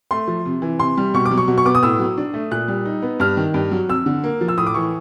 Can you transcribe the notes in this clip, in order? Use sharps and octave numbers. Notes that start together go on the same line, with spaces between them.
A3 C6
F3
C3
E3
C3 C6
G3
B2 C#6
D6
F#3
C#6
B2
C#6
B3 D6
D#6
A2 E6
F#3
D4
A3
A#2 F#6
G3
D#4
B3
G2 F6
D#3
G2
F#3
F2 E6
D3
A#3
F3
E6
A2 D#6
D6
E3 C#6